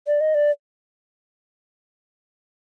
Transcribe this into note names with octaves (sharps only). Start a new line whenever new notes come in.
D5
D#5
D5